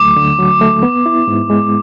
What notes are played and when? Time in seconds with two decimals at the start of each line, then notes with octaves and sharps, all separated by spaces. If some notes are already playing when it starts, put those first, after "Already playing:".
Already playing: D2 F#3 A3 D6
0.16 D3
0.39 F#3
0.61 A3
0.83 B3
1.06 E4
1.27 G#2
1.50 G#3